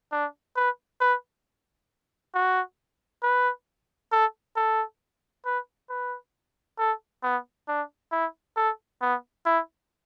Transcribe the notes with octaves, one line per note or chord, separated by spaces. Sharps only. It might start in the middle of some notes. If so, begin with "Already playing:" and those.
D4
B4
B4
F#4
B4
A4
A4
B4
B4
A4
B3
D4
E4
A4
B3
E4